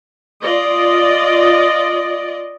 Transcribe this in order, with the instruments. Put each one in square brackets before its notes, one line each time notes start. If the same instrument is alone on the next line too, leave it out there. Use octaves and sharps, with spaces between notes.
[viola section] F4 D5 D#5